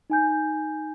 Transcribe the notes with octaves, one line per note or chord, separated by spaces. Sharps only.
D#4 G#5 G6